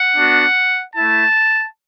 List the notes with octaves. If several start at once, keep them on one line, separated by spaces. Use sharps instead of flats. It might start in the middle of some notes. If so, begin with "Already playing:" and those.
Already playing: F#5
B3 D4 F#4
A3 E4 A5